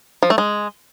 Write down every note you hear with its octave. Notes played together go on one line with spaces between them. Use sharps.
F3
A3
G#3